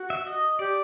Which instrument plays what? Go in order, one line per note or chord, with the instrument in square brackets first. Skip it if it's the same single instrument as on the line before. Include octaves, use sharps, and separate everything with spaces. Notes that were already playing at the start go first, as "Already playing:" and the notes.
Already playing: [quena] F#4
[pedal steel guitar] E5
D#5
[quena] G4 [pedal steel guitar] D5